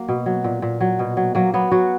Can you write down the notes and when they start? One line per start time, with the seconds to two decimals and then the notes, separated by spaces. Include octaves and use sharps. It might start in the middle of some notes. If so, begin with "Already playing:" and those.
Already playing: F#3 A#3
0.08 B2
0.26 F#3
0.44 A#2
0.62 A#2
0.81 F#3
0.99 B2
1.17 F#3
1.35 F#3 A#3
1.54 F#3 B3
1.71 F#3 F#4